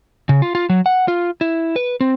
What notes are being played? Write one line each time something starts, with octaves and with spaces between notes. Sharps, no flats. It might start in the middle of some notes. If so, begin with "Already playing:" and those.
C#3
F4
F4
F#3
F#5
F4
E4
B4
C4